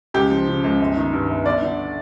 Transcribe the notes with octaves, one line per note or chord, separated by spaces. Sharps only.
C#2 G4
F3
C#3
C#2
G1
D#3
G2
G1
G1 D5
D3